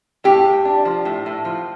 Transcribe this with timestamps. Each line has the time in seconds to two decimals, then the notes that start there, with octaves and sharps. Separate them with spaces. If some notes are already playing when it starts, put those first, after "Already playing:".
0.24 A2 G4
0.45 A2
0.65 D4
0.85 F3
1.05 A2
1.26 A2
1.45 F3